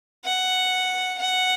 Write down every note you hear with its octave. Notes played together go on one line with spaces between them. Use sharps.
F#5
F#5